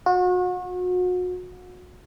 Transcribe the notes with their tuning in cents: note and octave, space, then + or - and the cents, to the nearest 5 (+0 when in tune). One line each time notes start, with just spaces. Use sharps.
F#4 -35